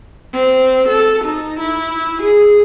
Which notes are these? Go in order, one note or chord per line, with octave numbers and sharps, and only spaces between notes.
C4
A4
D#4
E4
G#4